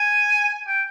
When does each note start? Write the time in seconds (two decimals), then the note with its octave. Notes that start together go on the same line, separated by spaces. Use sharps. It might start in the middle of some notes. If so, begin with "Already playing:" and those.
Already playing: G#5
0.67 G5